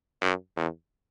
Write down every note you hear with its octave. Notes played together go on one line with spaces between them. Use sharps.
F#2
E2